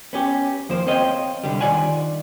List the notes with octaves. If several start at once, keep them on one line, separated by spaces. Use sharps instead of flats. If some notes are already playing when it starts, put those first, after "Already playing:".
B3 C#4 G4
D#2 F3 A#3 C5
C4 C5 C#5 D#5 F5 G5
C2 D3 G3
D#3 E3 F4 D5 F#5 G#5